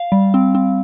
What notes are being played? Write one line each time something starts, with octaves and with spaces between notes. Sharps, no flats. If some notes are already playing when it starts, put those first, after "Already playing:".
Already playing: F5
G3
C4
C4